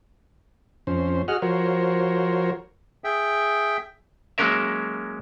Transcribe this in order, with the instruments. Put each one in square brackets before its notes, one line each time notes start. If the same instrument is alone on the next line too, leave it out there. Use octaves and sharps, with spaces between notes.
[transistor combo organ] F2 C#4 C5
F#4 G#4 D#5 F#5 F6
F3 F#4 A#4 C5 C#5
[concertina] G#4 E5 G5
[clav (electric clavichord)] F#3 G#3 A#3 C#4 A#4 E5